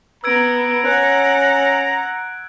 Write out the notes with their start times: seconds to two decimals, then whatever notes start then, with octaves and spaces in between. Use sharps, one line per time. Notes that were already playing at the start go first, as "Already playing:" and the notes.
0.24 B3 A#5 E6 G#6 D7
0.85 C#4 F#5 F#6